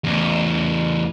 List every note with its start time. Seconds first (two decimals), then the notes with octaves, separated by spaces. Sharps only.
0.04 E2 A2